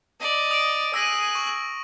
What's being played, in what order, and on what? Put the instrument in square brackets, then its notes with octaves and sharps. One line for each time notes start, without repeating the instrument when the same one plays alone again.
[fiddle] D5 D#5
[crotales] D#6 D7
[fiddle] G#4 F#6 [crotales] E6 A#6 D#7
[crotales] C#6